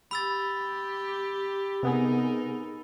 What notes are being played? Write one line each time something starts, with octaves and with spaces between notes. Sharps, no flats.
G4 B5 E6 A6
C3 B3 D#4 G#4 A#4